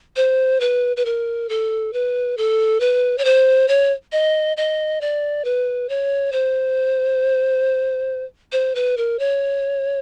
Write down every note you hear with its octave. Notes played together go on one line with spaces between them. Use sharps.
C5
B4
B4
A#4
A4
B4
A4
B4
C#5
C5
C#5
D#5
D#5
D5
B4
C#5
C5
C5
B4
A#4
C#5